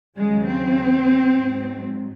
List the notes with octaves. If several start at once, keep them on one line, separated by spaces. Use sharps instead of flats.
D#2 C#3 F#3 G#3
C4
G#2 F#3